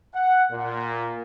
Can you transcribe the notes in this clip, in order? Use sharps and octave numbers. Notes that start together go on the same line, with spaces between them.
F#5
A#2